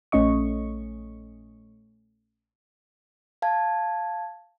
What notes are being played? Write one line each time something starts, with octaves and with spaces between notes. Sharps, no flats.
A#1 A3 C#4 D#5 C#6
F5 A5 G#6